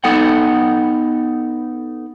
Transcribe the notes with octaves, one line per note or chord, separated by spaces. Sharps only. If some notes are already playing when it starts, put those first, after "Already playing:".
B3 D#4 A4 F#5 G5